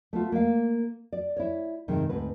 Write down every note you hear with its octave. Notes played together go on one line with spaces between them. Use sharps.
A3 B3 F4
A#3 F5
D5
E4 C#5
G2 C3 D#3 G#3
D2 G#2 C4 B4